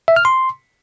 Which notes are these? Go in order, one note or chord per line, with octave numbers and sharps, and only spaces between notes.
E5
F6
C6